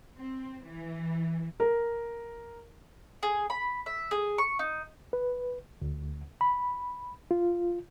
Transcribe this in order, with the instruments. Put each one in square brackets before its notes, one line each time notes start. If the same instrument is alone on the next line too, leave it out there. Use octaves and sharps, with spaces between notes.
[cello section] C4
E3
[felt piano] A#4
[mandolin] G#4
B5
E5
G#4
C#6
D#4
[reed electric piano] B4
D2
B5
F4